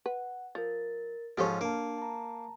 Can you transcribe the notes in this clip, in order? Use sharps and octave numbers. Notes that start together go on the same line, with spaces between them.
B4 F#5
F3 A#4 A6
G#2 F3 C#4 G4 A4 C#5 F6
A#3 D4 A5
A5 A#5